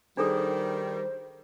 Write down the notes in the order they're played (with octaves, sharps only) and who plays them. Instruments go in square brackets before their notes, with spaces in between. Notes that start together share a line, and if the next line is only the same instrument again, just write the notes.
[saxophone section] D#3 G3 [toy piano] D4 G#4 A4 [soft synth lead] C5